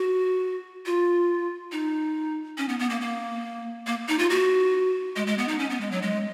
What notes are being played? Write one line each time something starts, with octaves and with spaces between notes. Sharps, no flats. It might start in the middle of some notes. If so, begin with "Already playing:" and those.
Already playing: F#4
F4
D#4
C#4
B3
B3
A#3
A#3
A#3
D#4
F4
F#4
G#3
G#3
B3
D#4
C#4
B3
G#3
F#3
G#3